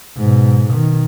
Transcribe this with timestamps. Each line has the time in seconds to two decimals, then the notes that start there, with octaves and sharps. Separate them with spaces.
0.17 G#2 B2
0.69 B2 D#3